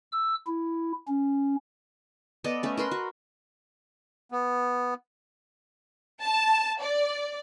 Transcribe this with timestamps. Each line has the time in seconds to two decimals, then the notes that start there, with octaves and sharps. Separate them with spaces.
0.12 E6
0.47 E4
1.08 C#4
2.44 B3 A4 D5 D#5
2.63 A3 C#4
2.77 A#4 B4 B5 C6
2.91 F#4
4.32 B3
6.23 A5
6.82 D5